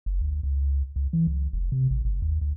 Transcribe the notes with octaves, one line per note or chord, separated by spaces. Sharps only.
F#1
D2
C#2
C#2
E3
C#2
F1
C3
A1
G1
D#2
D2